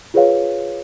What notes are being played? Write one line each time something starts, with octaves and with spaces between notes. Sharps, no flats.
F4 G#4 B4 C#5 F5